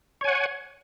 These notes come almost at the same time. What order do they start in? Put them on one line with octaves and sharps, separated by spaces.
C#5 G#5 F#5